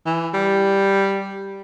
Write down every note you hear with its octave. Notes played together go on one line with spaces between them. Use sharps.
E3
G3